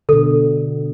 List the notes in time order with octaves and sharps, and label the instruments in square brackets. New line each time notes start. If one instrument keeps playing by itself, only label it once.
[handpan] B2 D3 [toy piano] A4